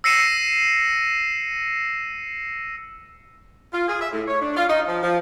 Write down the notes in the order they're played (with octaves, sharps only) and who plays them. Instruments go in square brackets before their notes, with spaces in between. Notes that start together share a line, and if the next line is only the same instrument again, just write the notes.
[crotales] E6 A#6 C7 C#7 D#7 E7
[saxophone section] F4
G#4
E5
A2
C#5
D4
F4
D#4
F3
F3